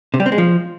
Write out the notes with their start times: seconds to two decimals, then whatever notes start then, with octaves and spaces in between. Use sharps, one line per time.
0.14 C3
0.20 G3
0.26 C4
0.32 G#3
0.38 F3